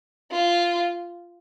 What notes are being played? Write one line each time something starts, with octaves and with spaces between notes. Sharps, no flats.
F4